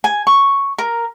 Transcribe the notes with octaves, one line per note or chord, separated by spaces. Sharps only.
G#5
C#6
A#4